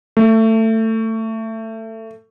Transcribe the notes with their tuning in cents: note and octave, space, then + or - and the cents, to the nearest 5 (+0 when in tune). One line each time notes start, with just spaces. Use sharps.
A3 +20